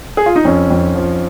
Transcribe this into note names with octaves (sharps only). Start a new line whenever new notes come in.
G#4
F4
D#4
F2 C#4
F2
F3